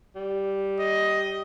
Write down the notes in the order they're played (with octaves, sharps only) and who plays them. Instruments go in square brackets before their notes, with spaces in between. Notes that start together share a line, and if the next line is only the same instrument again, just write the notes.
[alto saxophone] G3
[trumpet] D#5